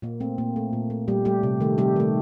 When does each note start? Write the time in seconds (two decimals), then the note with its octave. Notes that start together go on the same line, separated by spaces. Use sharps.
0.02 A#2 A#3
0.20 A3 C4
0.38 A#2 A#3
0.56 A3
0.73 A#2
0.90 A3
1.08 A#2 G3 G4
1.25 G3 A3 G4
1.43 C3
1.60 D#3 A3
1.78 C3 G3 G4
1.96 D#3 A3